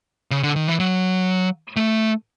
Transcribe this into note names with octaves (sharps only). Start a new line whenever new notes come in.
C#3
D3
D#3
E3
F#3
A3